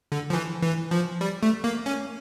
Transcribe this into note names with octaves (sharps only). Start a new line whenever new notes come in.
D3
F3
E3
E3
F3
G3
A3
A#3
C#4